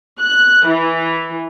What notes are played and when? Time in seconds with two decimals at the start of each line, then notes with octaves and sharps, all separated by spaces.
0.21 F#6
0.67 E3